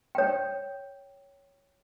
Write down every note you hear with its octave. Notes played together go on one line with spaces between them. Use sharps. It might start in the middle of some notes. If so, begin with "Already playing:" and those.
C#5 G5